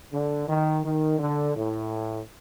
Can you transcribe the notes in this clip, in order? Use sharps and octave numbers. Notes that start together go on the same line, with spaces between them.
D3
D#3
D#3
D3
A2